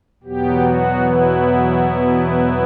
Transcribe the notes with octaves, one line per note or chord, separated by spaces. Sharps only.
E2 B2 F#3 B3 G4
F#4
E4